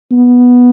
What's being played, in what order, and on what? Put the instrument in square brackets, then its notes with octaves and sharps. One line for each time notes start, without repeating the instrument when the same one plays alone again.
[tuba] B3